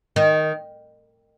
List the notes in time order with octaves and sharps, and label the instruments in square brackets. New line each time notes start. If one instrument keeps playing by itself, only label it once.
[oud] D#3